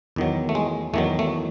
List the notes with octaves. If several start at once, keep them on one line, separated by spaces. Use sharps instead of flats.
E2 D#3 F#3
A3
G#3
E2 D#3 F#3 A3
A3